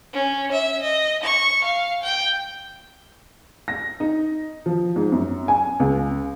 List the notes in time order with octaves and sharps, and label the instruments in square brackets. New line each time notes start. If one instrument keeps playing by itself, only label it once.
[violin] C#4
E5
D#5
C#6
F5
G5
[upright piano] A#6
D#4
F3
G#2
F#2
G#5
C#2